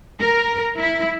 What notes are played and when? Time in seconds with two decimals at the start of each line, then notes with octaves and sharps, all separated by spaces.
0.20 A#4
0.78 E4